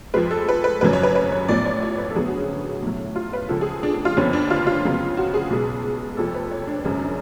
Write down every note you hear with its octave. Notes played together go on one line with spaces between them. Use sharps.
F2 F3 G#3 B4
A4
B4
B4
G#1 F#2 C#3 F#3 B4
C#5
B4
B4
C#5
A1 A2 F3 B3 D5
C#5
C#5
B4
A4
D2 D3 F#3 B3 G#4
F#4
C#4
C#4
B1 A2 F#3
F4
B4
C#2 C#3 F3 A4
G#4
D4
D4
F4
F#1 F2 D3 F3 B3 C#4
D4
F4
F4
C#2 C#3 F#3 B3
F#4
G#4
B1 B2 G#3 B3
F1 F2 F3 A4
B4
C#5
D4
G#1 F#2 C#3 G#3 C#4
D4